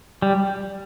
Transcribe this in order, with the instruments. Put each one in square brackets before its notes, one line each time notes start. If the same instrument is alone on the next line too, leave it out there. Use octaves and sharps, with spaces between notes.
[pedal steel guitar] G3